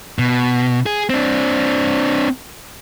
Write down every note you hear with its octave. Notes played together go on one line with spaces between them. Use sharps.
B2
G#4
C4 D4